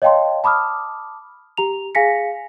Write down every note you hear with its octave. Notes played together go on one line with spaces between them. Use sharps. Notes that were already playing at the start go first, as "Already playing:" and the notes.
C#5 D#5 F5 G5 A5 C6
A5 B5 D6 D#6 F6
G4 A#5 F7
G#4 F5 G#5 A#6 B6 C#7